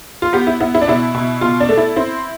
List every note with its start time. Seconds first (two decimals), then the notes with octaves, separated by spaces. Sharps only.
0.22 F4
0.33 B3 G4
0.47 E4
0.60 B3 E4
0.75 E4
0.81 D4
0.88 B2 E4
1.14 B2
1.41 B2 F4
1.60 D4
1.69 A3
1.77 E4
1.96 C4 E4